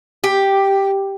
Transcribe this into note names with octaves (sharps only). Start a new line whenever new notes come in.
G4